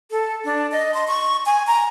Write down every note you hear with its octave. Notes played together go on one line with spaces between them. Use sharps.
A4
D4
D#5
C6
C#6
G#5
A#5